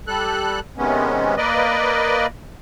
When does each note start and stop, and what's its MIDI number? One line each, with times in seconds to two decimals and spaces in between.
0.08 0.60 55
0.08 0.60 69
0.08 0.60 90
0.78 1.35 48
0.78 1.35 51
0.78 1.35 56
0.78 1.35 59
0.78 1.35 61
1.37 2.26 58
1.37 2.26 71
1.37 2.26 74
1.37 2.26 75